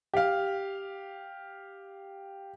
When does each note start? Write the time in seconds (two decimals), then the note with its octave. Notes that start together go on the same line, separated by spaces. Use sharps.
0.14 G4 F5